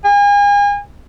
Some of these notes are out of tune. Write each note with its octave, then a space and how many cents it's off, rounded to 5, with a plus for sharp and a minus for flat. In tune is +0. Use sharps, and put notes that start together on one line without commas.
G#5 -35